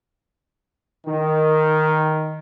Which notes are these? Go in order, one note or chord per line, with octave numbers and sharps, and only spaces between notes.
D#3